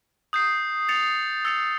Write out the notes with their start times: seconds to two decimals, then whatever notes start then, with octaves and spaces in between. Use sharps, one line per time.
0.33 D#6 G6 C7
0.89 A6 C#7 F7
1.45 E6 A6 C#7 F7